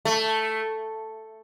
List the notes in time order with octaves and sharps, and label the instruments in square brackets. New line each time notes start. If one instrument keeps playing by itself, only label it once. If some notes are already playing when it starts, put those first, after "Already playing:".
[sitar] A3